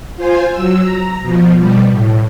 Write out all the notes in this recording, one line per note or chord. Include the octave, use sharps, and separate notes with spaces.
F4 C5 G#5
F#3 E6
A#5
B2 F3
B2 G3
A2